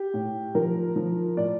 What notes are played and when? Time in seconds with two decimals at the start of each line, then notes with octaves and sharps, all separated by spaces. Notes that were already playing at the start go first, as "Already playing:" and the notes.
Already playing: G4
0.14 A2
0.55 F3 A#4
0.96 F3
1.37 A2 D5